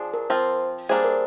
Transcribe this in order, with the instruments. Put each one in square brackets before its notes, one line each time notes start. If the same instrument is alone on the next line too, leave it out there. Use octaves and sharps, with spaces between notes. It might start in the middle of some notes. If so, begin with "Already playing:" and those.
Already playing: [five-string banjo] F3 D4 G#4
[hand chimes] A#4
[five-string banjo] F3 C4 F4 [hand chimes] C5
[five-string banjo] G3 A#3 D4 G#4 [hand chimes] C5
[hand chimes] A#4